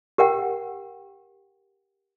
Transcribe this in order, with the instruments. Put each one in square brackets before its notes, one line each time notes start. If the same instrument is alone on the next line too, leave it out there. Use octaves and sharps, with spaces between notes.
[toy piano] G4 A#4 F#5 G5